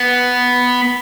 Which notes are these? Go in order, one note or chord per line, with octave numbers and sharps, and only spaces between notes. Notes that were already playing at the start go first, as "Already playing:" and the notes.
Already playing: B3